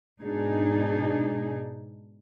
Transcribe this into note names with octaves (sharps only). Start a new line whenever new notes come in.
G#2 B2 D4 D#4 G#4